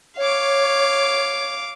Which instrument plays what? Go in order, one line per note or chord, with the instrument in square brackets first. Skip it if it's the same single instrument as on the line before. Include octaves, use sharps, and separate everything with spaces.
[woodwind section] C#5 [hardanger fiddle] F5 D6